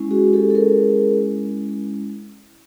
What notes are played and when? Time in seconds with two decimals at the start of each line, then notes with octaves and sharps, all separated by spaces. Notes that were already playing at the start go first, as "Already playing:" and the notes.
Already playing: G#3 C#4 E4
0.11 F#4 G#4
0.33 G4 A4
0.50 A4
0.55 G#4 A#4